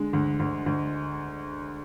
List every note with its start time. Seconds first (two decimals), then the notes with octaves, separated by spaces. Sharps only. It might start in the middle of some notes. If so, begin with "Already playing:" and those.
Already playing: D3 G#3
0.13 D2
0.40 D2
0.66 D2